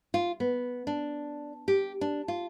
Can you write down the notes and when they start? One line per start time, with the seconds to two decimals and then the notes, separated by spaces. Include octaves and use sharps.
0.14 F4
0.40 B3
0.87 D4
1.68 G4
2.01 D4
2.28 F4